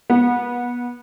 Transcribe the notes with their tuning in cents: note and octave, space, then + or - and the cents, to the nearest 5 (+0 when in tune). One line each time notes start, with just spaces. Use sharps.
B3 -25